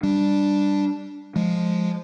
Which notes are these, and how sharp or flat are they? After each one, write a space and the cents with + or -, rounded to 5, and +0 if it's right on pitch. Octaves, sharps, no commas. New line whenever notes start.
G3 +0 D4 +0
F3 +5 G#3 +0